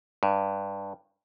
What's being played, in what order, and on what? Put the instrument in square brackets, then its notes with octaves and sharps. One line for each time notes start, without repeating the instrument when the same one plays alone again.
[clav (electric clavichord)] G2